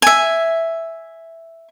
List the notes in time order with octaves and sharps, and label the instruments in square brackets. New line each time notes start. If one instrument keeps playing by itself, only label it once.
[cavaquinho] E5 G#5